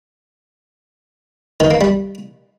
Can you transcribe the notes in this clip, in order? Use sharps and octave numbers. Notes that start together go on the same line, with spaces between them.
D#3
A#3
G3